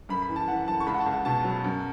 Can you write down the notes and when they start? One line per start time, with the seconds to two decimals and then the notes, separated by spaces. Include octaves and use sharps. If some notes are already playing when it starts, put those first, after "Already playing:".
0.09 F#2 B5
0.22 B5
0.29 E3
0.36 A5
0.48 E3 F#5
0.68 F#2 A5
0.80 C#6
0.86 C#2 B5
0.94 F#5
1.00 A5
1.06 C#2
1.13 F#5
1.25 B2 A5
1.44 F#3
1.64 F#2